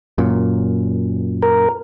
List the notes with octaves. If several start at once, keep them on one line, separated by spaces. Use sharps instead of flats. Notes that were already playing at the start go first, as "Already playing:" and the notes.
F#2 A#2
A#4